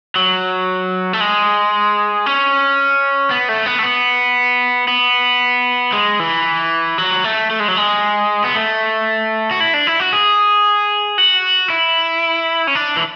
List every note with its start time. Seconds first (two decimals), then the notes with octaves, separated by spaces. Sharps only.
0.16 F#3
1.13 A3
1.21 G#3
2.26 C#4
3.31 B3
3.49 A3
3.66 B3
3.79 A3
3.83 B3
4.88 B3
5.93 G#3
6.20 E3
6.98 F#3
7.24 A3
7.51 A3
7.60 G#3
7.68 F#3
7.77 G#3
8.44 B3
8.56 A3
9.51 F#4
9.60 E4
9.74 D4
9.87 E4
10.00 F#4
10.13 G#4
11.18 F#4
11.70 E4
12.67 C#4
12.75 D4
12.96 E3